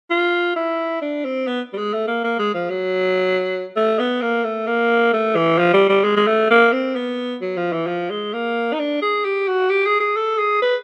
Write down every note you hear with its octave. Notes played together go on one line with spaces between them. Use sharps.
F4
E4
D4
C4
B3
G3
G#3
A3
A#3
A#3
G#3
F3
F#3
A3
B3
A#3
A3
A#3
A3
E3
F3
G3
G3
G#3
G#3
A3
A#3
C4
B3
F#3
F3
E3
F3
G#3
A#3
D#4
D4
G#4
G4
F#4
G4
G#4
G#4
A4
G#4
B4